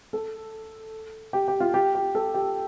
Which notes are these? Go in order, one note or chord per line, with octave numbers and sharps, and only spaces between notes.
A4
G4
G4
F4
G4
G4
A4
G4